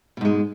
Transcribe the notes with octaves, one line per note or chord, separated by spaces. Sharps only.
G#2 B2 G#3